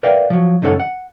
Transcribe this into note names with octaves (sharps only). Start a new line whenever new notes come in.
A#4 B4 D5 E5 F5 G5
F3 F#3
C#2 F#2 D#3 C#4 A4 F#5
F#5